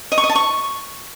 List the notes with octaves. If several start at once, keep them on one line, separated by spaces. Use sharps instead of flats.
D#5
C#6
D#5
A5
C#6